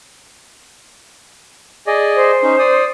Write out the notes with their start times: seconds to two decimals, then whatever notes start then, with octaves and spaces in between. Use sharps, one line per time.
1.87 G#4 D5 D#5
2.16 C5
2.43 C#4 D#4
2.59 D5 D#6